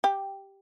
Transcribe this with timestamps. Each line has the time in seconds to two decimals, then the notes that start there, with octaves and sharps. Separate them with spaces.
0.04 G4